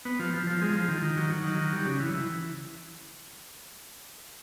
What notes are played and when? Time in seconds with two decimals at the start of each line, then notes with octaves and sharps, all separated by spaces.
0.05 B3
0.19 F3
0.34 F3
0.47 F3
0.62 G#3
0.75 F3
0.88 D#3
1.02 D#3
1.17 F#3
1.30 F#3
1.44 D#3
1.59 F#3
1.73 G3
1.86 C#3
2.00 E3
2.14 E3